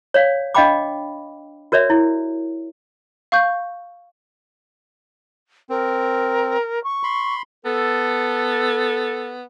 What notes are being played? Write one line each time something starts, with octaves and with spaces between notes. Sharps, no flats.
C#5 D5 F5
D4 D#5 F5 G5 B5 D6
F#4 A#4 C#5 D5 E5
E4
F5 C#6 G6
C4 A#4
C#6
B5 C6
B3 A4